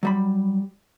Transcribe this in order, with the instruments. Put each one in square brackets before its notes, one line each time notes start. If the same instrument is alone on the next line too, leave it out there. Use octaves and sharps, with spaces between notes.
[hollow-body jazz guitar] F#3 G3 B5